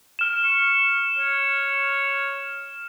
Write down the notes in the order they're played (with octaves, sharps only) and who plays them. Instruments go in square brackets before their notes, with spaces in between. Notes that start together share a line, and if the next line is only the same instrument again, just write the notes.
[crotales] F6 E7
[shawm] C#6
C#5